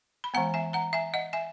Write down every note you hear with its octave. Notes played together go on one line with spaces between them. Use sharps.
B5
E3 G#3 B3 F#5 A#5
E5 G#5
F#5 A#5
E5 G#5
D#5 F#5
E5 G#5